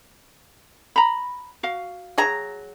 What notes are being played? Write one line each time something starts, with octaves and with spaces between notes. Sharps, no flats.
A#5 B5
F#4 F5
F#3 G#4 A#5